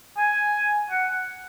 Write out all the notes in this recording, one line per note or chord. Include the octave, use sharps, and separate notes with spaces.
G#5
F#5